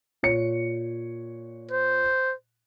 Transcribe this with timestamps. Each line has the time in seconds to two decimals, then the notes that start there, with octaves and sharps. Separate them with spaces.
0.23 A#2 C#5 C#7
1.71 C5